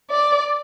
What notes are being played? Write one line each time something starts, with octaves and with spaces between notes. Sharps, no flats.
D5